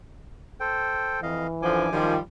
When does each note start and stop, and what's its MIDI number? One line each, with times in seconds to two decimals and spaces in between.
0.60 1.20 69
0.60 1.20 72
0.60 1.20 79
1.23 1.47 41
1.23 1.90 52
1.23 1.47 75
1.23 1.47 77
1.62 2.14 42
1.62 1.85 50
1.62 1.85 53
1.62 2.14 80
1.62 2.14 86
1.92 2.17 51
1.92 2.18 53
1.92 2.18 55